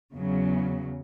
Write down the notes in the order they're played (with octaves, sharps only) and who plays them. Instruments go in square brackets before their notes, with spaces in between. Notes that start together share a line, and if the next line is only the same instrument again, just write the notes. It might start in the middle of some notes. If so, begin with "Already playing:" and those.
[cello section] E2 C#3 F#3